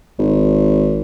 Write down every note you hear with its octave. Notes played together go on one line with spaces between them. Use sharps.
G#1